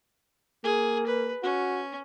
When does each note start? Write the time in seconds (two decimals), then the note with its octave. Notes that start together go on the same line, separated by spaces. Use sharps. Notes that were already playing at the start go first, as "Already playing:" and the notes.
0.64 A#3 G#4
1.07 B4
1.43 C#4 F#4